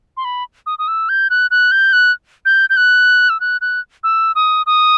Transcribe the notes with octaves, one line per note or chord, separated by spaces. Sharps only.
C6
B5
D#6
D#6
E6
G6
F#6
F#6
G6
F#6
G6
G6
F#6
E6
F#6
F#6
E6
D#6
D#6